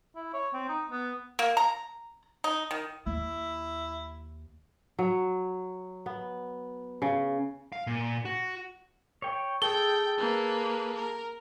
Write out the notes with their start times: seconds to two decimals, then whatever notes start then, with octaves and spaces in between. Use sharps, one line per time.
0.16 E4
0.34 C#5
0.54 C4
0.69 D#4
0.91 B3
1.39 A#3
1.57 A#5
2.44 D#4
2.71 D#3
3.06 D#2 E4
4.99 F#3
6.06 B3
7.02 C#3
7.72 F5
7.87 A#2
8.25 F#4
9.22 C#5 G5
9.62 G#4 A4 G5 G7
10.17 A#3 B4
10.95 A#4